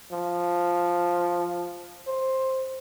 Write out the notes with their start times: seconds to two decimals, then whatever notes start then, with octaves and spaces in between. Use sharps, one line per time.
0.12 F3
2.07 C5